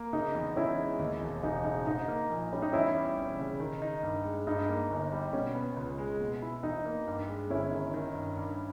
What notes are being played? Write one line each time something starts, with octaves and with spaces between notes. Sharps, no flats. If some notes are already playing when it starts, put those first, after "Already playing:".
Already playing: A#3
C#3 D#4
E2
E2 C#4 E4
G#3
D#2
E1
E1 D#4
C#3 D#4
G#2 D#4
A#3
A#1
G3 C#4
D#4
E2 C#4 E4
G3
E1
C#3
D#3
D#4
G2
G#3
G2 D#4
A#3
G1
G3
B2 C#4
B3
C#2
G#3
B2
E4
E2 D#4
A#3
G2
G#3
G1 C#4 E4
D#3
D#3
G2
G2